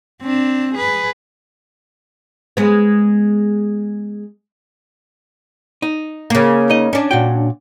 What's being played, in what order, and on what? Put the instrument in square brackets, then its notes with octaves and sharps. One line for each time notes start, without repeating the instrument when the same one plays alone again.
[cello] C4 D4
G#4 B4
[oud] G#3 B3
[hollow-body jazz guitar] D#4
[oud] C#3 A#3
[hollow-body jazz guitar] D#4 D#5
[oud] C#4 D4
[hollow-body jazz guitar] A#2 F#4 G5